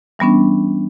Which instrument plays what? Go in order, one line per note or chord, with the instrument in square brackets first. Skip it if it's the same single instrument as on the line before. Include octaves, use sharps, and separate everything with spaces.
[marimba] E3 G3 B3 C#4 D4